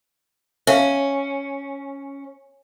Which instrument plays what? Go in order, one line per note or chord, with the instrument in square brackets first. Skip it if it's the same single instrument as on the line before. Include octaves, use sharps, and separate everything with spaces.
[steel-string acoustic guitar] C#4 [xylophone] E5 F5